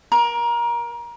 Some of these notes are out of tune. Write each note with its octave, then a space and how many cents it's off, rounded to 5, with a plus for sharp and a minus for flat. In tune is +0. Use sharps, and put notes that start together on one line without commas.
A#4 +25